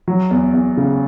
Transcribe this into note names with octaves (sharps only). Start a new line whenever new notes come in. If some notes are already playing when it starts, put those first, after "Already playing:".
F#3
E2
E2
C#3